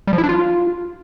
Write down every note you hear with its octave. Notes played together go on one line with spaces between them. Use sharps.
G3
F3
E4
D4
F4